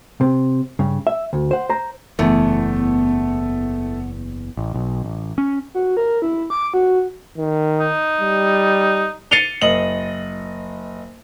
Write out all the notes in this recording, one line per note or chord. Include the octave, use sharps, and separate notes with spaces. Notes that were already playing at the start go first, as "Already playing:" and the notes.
C3
G2 C#3
E5
D2
C5 F#5
C5 A#5
F#1 E2 A3 B3
A1
B1
A1
C#4
F#4
A#4
E4
D6
F#4
D#3
D#4
G3
A6 C7 C#7 D#7 F7 G7
F#1 D#5 F#7